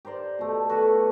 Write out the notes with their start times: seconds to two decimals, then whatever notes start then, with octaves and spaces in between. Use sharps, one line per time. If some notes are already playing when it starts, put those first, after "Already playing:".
0.05 G4 A#4 C5 D5
0.39 B2 A3
0.69 F#4 A4 B4